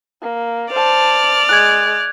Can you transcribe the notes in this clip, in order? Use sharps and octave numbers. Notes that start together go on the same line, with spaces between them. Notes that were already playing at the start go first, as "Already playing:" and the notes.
A#3
C5 D5 A5 F6
G#3 F#6 G#6